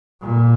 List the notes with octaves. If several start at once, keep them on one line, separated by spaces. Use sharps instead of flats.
A#2